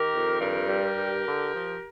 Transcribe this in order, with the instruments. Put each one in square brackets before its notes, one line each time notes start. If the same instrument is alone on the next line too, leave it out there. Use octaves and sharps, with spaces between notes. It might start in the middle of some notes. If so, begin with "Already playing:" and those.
Already playing: [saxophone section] D#3 G4 A#4
F2
G2 G4 A#4
G3
G2
D3
F3